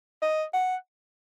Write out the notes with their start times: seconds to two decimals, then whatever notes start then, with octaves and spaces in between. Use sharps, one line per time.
0.22 D#5
0.54 F#5